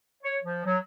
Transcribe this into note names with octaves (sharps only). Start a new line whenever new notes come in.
C#5
F3
F#3